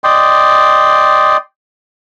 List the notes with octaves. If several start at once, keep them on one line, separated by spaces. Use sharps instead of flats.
D5 D#5 G5 C6